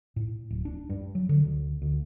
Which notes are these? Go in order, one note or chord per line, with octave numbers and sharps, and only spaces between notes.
A2
D1
D4
G2
F#3
D3
D2
D2